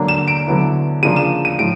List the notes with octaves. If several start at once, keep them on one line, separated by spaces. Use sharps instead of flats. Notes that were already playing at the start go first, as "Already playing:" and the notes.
Already playing: D3 F#3 A#3 D4
E7
D7
D3 F#3 B3 E4
C#3 F3 A#3 D4 F4 D#7
E7
D#7
A2 F3 D7